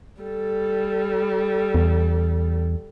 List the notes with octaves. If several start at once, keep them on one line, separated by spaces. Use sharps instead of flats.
G3 A4
E2